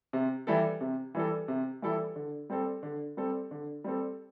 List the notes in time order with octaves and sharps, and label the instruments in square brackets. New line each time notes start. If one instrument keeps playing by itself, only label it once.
[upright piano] C3
E3 G3 E4 A4
C3
E3 G3 E4 A4
C3
E3 G3 E4 A4
D3
G3 C4 A4
D3
G3 C4 A4
D3
G3 C4 A4